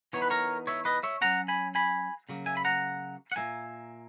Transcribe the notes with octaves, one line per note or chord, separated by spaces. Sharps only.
E3 B3 D#4 C#5
B4
A#4 C#5
C#5 E5
B4 D#5
C#5 E5
F#3 A#3 C#4 F#5 A#5
G#5 B5
G#5 B5
C#3 F#3 A#3
E5 G#5
B5
F#5 A#5
F#5
A#2 F#3 A#3 E5 G#5